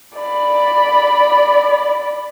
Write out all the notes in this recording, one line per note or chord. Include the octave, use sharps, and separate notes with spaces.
D5 B5